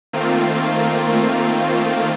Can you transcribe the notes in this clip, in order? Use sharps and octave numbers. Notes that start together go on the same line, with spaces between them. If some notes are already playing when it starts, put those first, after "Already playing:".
D#3 A3 A#3 C4 F4